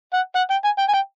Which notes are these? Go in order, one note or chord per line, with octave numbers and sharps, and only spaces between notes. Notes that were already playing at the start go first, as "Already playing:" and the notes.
F#5
F#5
G5
G#5
G5
G#5
G5